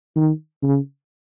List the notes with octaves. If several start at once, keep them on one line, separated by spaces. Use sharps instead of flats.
D#3
C#3